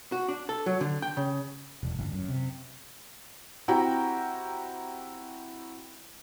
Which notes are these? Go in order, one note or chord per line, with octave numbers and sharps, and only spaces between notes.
F#4
D4
A4
F#3
D3
G5
C#3
E1
G1
F#2
C3
C4 E4 F#4 G4 G5 A#5